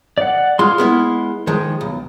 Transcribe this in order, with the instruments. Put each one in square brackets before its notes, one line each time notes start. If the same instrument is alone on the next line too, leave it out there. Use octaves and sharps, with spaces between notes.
[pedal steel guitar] D5 F#5
[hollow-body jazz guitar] G#3 F4 [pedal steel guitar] C6 F6
[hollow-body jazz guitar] G#3 B3 E4
D#3 F3 G#3
B1